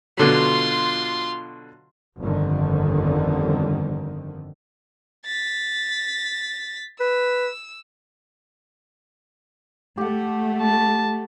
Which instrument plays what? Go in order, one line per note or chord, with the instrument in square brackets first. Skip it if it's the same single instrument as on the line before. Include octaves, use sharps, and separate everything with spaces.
[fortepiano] B2 D3 F#3 [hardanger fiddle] F4 C6
[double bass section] G1 F2 D3 D#3
[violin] A6 B6
[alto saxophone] B4 [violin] E6
[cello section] A3 [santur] G4 F#5
[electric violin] A5